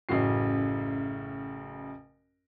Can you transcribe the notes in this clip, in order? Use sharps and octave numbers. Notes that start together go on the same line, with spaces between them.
A1 F#2 C#3 F#4 C7